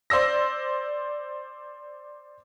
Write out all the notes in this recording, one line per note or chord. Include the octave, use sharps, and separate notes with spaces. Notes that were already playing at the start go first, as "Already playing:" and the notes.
C5 D5 E6 A#6